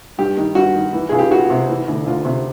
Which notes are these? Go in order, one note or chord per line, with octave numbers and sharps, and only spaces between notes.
G2 G4
D#3
G2 F#4
D#3
E3
C#2 G#4
G4
C#2 F#4
C3
E3
D2
D2 F4
C3